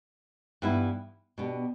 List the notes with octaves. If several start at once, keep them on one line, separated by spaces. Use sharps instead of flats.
G2 E3 B3 E4
B2 B3 D4 G4